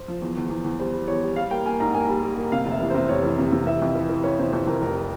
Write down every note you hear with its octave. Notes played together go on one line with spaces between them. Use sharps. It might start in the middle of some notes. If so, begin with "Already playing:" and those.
Already playing: C5
F3
E2
E2
E2
E2
G3 C5
G3
E2 C#5
G3
G3 F5
A#3 G5
A#3 G#5
G#2 A#5
A#3 G#5
G3
G3
A#3
C3 F5
F1
E5
E3
C3 C5
F1 C#5
E3
C3
C3
E3 E5
F2
E3
E3
E3 C#5
C3 C5
F2 C5
F2 A#4
F1 A#4